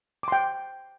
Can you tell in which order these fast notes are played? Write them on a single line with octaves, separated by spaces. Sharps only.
D6 C6 G5